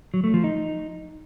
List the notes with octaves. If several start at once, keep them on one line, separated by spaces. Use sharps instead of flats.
F#3
A3
F3
D#4